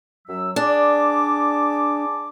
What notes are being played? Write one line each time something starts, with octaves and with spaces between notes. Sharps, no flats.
F#2 F#3 E6
D4 G#4 A5 D6